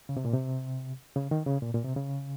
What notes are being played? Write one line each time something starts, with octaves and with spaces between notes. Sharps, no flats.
C#3
C3
A#2
C3
C#3
D#3
C#3
A#2
A#2
C3
C#3